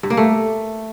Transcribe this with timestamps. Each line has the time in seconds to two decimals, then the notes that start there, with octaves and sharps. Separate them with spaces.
0.03 G2
0.10 A#3
0.17 A3